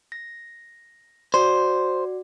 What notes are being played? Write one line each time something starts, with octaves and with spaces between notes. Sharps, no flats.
A#6
F#4 C5 D5